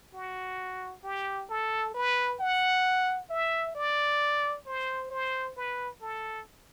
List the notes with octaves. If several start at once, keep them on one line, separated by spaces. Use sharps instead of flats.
F#4
G4
A4
B4
F#5
E5
D5
C5
C5
B4
A4